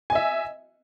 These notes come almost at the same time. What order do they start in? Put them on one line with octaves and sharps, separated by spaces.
G#5 D#5 E5